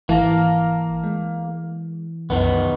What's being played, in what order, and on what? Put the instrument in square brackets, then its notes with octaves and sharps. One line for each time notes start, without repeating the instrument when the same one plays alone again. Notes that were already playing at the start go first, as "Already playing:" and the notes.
[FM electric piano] G#1 A5 A#6 [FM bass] E3 [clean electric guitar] A#3
[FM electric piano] G#3
[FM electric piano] C2 F#2 [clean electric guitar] D#3 B3